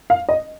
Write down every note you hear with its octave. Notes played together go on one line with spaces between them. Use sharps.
F5
D#5